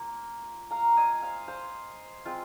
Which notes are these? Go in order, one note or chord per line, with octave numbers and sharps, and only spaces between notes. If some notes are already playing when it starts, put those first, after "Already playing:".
Already playing: A#3 F4
F5 A#5
D#5 G#5
C5 F5
C5 F5
G#3 C4 F4